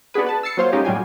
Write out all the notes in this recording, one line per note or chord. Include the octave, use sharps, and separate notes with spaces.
B3 D4 F#4 G#4 B4
B4 A5
E6 A6 C7 C#7
F#3 A#3 F4 C5 C#5 F5
A#2 G#3 C#4 D#4 G4
A2 F#3 G3 F4 G5 G#5